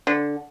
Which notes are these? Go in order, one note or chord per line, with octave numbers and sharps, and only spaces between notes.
D3